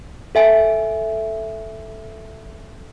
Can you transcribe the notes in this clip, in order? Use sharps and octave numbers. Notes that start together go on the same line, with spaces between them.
A4 E5 G#5 D7